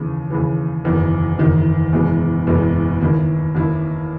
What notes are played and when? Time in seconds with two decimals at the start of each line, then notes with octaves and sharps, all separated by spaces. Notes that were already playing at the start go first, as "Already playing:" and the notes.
Already playing: D#2 C#3 E3
0.30 D#2 C#3 E3
0.85 F#1 E2 D#3
1.39 F#1 E2 D#3
1.92 F#1 E2 B2 G#3
2.47 F#1 E2 B2 G#3
3.00 D#2 D#3 A#3 E4
3.55 D#2 D#3 A#3 E4